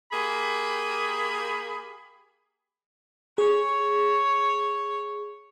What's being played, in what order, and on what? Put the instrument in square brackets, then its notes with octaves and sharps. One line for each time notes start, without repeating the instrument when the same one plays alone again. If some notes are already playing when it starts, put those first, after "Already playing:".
[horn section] A#3 G4 G#4 B5
[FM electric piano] G#4 [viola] C#5